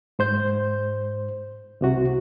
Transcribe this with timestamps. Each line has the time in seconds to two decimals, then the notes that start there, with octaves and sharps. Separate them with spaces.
0.19 G#2 C5 G6
1.81 C2 C3 F#4